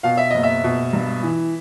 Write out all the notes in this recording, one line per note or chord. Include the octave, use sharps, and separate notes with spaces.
B2 F5
E5
F#1 D#5
E5
B2
G2
E3